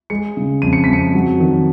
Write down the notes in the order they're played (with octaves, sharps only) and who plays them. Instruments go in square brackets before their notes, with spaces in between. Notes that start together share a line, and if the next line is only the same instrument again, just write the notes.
[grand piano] G#3 C#7
C#3
F2 D#7
C#7
F2 B6
C#7
F#3
D#3